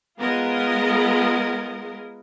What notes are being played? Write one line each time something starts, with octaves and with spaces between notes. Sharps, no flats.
G#3 B3 F4 G#4 A#4 D#5